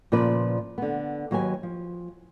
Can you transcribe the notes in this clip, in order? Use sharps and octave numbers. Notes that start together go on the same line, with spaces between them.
A#2 C#3 F3 A#4 B4 D5
D3 B3
D#2 F#3 G4 B4 G#5
F3